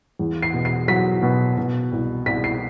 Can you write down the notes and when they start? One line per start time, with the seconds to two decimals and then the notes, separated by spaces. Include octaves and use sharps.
0.19 E2
0.42 C7
0.54 B2
0.65 C7
0.88 F#3 B6
1.22 B2
1.58 B2
1.92 C2
2.26 C2 B6
2.44 C7